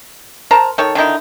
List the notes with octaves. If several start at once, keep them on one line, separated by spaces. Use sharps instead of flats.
A#4 C5 A5 A#5
D#3 A4 C#5
D3 D#3 D#4 E4